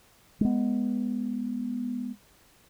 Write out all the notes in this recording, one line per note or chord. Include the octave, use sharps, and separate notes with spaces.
G#3 B3